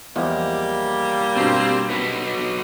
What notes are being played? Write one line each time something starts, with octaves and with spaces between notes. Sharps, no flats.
E2 F3 G3 G#3 A#3
G2 B2 C4
D#4 F#4 B4